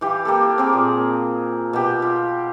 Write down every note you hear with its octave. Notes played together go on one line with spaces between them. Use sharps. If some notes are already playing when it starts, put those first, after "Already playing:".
E3 G4 F5
A#3 G4 A4
C4 G#4 A#4
A#2
B2 G4
F4